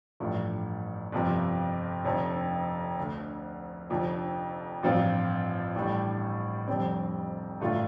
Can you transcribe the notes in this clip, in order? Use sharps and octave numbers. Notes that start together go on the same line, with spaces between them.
A1 G2 F3 A3
G1 F2 C3 F3
F1 F2 D3
D2 D3 A3
F1 F2 D3 F3
A1 G2 F3 C4 F4
A1 A2 G3 D4
F1 F2 D3 G3 C4
A1 G2 D3 A3 F4